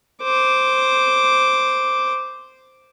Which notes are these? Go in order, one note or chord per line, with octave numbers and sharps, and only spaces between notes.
C5 D6